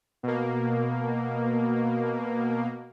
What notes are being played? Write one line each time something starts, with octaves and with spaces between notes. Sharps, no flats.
B2 A#3